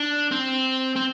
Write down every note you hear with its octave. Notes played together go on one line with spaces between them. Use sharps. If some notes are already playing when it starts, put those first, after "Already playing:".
Already playing: D4
C4
C4